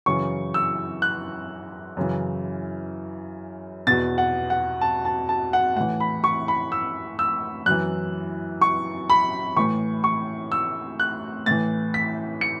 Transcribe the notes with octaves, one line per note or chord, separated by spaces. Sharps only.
F#2 C#3 E3 C#6
E6
F#6
F#2 C#3 E3
E2 B2 A6
F#5
F#5
A5
A5
A5
F#5
A2 E3 F#5
B5
C#6
B5
E6
E6
F#2 E3 F#6
C#6
B5
A2 E3 C#6
C#6
E6
F#6
A2 E3 A6
B6
C#7